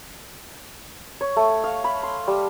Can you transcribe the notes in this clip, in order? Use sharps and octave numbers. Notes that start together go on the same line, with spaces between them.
C#5
A3
F5
B5
C6
G3